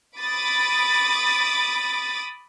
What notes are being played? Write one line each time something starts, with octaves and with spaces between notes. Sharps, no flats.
B5 D6 D#6 A6